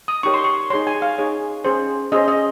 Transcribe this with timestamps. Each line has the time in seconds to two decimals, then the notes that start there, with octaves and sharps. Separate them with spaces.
0.08 D#6
0.23 D#4 G4 A#4 C#5 C#6
0.34 C6
0.44 C#6
0.70 D#4 G#4 C#5 C6
0.87 G#5
1.02 F5
1.18 D#4 G#4 C#5
1.64 C#4 G#4 C5
2.12 C#4 G#4 C5 D#5
2.28 D#5